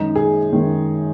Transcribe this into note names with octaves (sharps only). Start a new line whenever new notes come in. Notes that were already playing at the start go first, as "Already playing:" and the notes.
Already playing: F#2 D#3 G#3 D#4
G#4
F#2 D#3 G#3